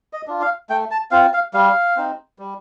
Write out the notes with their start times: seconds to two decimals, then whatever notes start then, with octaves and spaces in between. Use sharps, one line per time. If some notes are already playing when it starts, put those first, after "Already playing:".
0.13 D#5
0.28 D4 F4
0.41 F5
0.70 A3 G5
0.91 A5
1.11 C4 F4 F5
1.33 F5
1.54 G3 F5
1.97 C4 D#4
2.39 G3